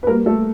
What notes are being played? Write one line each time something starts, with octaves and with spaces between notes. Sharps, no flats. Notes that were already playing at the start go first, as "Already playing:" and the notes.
B4
G3 A#3 A#4
A3 A4